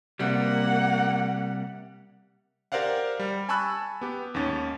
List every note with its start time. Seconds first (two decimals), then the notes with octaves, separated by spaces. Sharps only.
0.19 C3 G3 A#3 F#5
2.72 G4 A#4 C5 D5 F5 F#5
3.19 G3
3.49 G#5 A5 B5 C#6 E6 F#6
4.01 B3 G4
4.34 D#2 G#2 C#4 A6